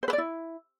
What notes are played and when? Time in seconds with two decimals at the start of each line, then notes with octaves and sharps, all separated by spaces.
0.03 C5
0.08 B4
0.13 D5
0.18 E4